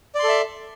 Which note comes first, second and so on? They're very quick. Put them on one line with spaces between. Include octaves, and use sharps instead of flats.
D5 C6 A4 E5